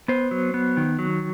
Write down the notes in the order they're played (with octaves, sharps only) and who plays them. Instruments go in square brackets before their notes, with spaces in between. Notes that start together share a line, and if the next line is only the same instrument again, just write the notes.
[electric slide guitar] B3 C5
F#3
B3
D#3
F#3